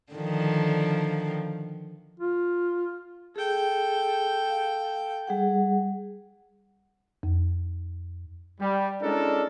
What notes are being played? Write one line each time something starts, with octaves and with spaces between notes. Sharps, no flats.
D3 D#3 F3
F4
G#4 A4 G5
F5
G3 G#4 F#5
F2
G3
G#3 C#4 D4 E4 A4 A#4